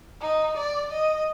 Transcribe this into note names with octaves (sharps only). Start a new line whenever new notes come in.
D#4
D5
D#5